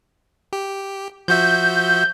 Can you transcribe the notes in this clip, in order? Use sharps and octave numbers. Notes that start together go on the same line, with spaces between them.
G4
F3 F#4 E5 G6